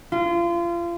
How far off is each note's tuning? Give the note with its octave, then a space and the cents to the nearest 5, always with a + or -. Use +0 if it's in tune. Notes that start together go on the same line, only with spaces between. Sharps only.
F4 -30